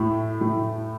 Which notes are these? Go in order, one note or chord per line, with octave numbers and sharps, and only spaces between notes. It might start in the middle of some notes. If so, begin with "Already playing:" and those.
Already playing: A2 A3
A2